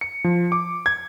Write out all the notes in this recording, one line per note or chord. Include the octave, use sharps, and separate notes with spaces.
C#7
F3
D6
G#6